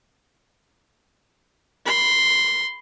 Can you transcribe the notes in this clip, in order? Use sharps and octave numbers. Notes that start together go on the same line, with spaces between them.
B5 C6